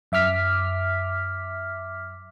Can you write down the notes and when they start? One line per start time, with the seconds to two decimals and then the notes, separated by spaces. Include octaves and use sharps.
0.12 F#2 E5 D6 F6 B6